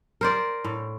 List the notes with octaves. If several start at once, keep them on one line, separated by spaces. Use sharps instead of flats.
A#4 C5 D5
A2